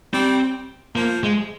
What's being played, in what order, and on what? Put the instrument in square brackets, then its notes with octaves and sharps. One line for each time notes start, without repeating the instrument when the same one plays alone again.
[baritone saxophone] G3 [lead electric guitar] C4
[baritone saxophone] F3 [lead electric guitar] A#3
[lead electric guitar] G#3